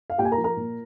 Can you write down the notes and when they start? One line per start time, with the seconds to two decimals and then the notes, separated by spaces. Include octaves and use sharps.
0.10 F5
0.18 A#2 G4 G5
0.25 G#5
0.31 A#4 A#5
0.37 F3
0.44 A#4 A#5
0.57 A#2